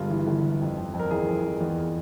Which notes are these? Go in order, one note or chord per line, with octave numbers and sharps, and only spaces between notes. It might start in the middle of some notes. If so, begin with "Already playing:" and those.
Already playing: G1 G2 G#3 F4
E3
G1
G2
F2
F2
F2
A#4
E3 G#4
F2
F2
E2